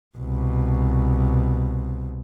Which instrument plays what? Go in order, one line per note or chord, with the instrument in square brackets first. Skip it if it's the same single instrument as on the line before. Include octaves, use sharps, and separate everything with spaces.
[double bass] C2 B2